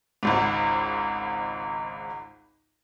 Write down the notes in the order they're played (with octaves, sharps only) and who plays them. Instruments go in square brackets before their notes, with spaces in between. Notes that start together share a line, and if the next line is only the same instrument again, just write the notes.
[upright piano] G#1 C#2 G#2